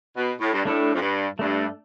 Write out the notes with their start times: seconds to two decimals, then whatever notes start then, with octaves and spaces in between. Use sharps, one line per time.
0.16 B2
0.40 A2
0.53 G2
0.65 A2 A3 D4 A4
0.95 F2
1.02 G2
1.39 G2 A3 D4 A4